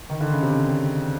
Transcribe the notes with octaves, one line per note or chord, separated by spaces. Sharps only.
D#3
D3
C#3
C3